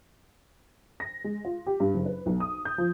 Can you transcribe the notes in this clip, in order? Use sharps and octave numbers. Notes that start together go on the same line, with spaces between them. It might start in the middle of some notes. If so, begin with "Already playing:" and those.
A#6
G#3
F4
G4
G2
F#1
B4
B1
D#6
G6
F3